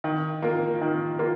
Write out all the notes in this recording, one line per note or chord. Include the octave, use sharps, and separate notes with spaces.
D#3
A#3 F4 A#4
D#3
A#3 F4 A#4